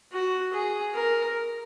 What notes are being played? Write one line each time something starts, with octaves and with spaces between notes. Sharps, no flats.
F#4
G#4
A#4